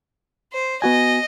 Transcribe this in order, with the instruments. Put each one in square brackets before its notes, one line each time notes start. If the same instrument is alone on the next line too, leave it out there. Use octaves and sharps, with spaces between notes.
[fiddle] C5
[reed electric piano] B3 F#4 G#5 [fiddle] D#5